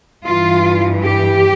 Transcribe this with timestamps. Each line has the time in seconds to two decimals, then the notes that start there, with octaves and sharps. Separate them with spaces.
0.25 G2 E3 F4
1.03 G4